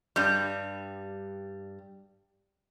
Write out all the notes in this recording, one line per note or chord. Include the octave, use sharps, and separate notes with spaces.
G2 G3